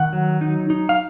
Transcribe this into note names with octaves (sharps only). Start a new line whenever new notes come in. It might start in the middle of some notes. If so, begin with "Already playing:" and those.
Already playing: D#3 F#5
F#3
D#4
D#4
F5